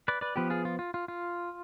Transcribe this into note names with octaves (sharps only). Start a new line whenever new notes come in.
B4 D5
B4 D5
F3 B3 G4 B4
F4 G#4
F4
F4
F4
F4